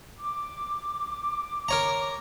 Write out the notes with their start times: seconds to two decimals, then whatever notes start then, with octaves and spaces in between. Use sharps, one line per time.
0.18 D6
1.69 A#4 C#5 A#5